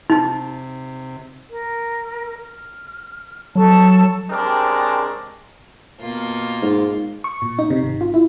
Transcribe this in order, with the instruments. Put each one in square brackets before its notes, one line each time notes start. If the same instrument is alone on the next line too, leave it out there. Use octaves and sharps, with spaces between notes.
[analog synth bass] C3 [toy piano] D#4
[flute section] A#4
F6
[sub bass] F#3 [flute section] A4 A5 C#6
[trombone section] C#3 G#3 C4 D4 G4 A#4
[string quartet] B2 A#3 F4
[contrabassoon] G#2
[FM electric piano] C#6
A#2
D#4
C3
G#1
F4
E4